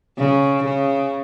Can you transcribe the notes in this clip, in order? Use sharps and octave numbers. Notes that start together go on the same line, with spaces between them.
C#3
C#3